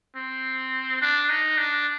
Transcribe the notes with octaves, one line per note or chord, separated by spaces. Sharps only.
C4
D4
D#4
D4